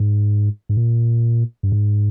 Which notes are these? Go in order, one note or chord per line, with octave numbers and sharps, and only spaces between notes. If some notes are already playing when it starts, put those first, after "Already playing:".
Already playing: G#2
G#2
A#2
G2
G#2